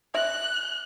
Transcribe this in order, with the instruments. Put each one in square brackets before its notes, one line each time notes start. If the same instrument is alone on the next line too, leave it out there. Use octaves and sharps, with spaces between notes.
[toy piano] E5 [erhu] F#6